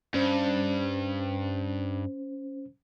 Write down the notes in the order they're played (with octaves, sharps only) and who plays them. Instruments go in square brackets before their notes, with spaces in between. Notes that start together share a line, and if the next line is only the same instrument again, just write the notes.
[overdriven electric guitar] G2 [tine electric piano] C#4 C5